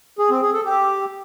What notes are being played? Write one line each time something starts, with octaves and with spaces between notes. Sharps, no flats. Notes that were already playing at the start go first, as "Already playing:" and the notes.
G#4
C4
G#4
A4
G4